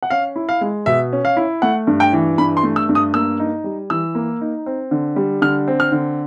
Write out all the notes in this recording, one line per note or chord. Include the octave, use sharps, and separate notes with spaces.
F#5
C#4 F5
E4
F5
G#3
B2 E5
C#4
F5
E4
A3 F#5
G2
G5
E3
G2 B5
C6
A3
E6
G2
D#6
A#3 E6
D#4
G3
E3 E6
A#3
D#4
C4
D3
G3
D3 F6
C4
F6
D3